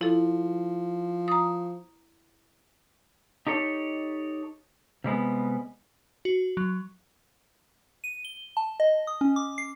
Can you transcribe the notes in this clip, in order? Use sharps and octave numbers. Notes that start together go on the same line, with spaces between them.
F3 E4 A4
A#5 D#6
D#4 G4 A4 C#5
C3 G3 G#3 B3
F#4
F#3
D#7
G7
A5
D#5
D#6
C#4
D6
C7